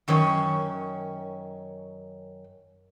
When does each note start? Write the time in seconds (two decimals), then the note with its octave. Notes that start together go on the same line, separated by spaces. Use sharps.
0.08 F#2 D#3 C#4 C#5